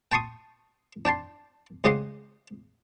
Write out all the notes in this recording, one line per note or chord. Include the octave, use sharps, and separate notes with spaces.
G5 A5 C6 C#6 D#6
D4 G5 A5 C6
C#2 C#3 G4 D#5 F#5 C6